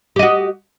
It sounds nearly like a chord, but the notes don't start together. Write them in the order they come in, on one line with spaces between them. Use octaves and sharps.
G4 D#5 F#4